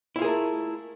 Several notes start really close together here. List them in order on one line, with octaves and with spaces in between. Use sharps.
E4 F4 G#4 A#4 A3